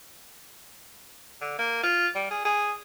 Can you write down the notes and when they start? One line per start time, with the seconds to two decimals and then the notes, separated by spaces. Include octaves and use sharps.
1.41 D3
1.59 A#3
1.84 F4
2.15 G3
2.31 G#4
2.45 G#4